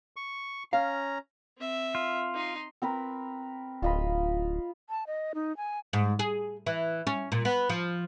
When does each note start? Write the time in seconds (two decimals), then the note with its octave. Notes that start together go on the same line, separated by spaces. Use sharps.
0.16 C#6
0.73 C#4 F5 A#5
1.58 C4 E5
1.95 F4
2.34 D#4 C6
2.82 C4 A#4 B4
3.82 D1 F4 D#5 B5
4.89 A5
5.07 D#5
5.35 D#4
5.57 G#5
5.93 G#2
6.19 G#4
6.66 E3
7.07 C#4
7.32 A#2
7.45 B3
7.69 F3